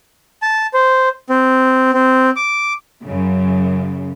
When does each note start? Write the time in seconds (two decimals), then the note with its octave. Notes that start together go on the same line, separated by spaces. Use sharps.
0.42 A5
0.74 C5
1.29 C4
1.94 C4
2.36 D6
3.05 F#2 C#3